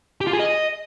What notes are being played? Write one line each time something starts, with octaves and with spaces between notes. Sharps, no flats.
G4
F4
G#4
D#5